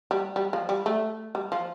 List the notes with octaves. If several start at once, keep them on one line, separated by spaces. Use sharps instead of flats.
G3
G3
F3
G3
A3
G3
F3